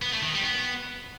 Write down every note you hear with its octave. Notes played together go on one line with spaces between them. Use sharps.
B3
A3
D#3
G3
B3